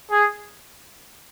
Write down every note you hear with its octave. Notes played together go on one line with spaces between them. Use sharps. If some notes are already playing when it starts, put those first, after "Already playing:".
G#4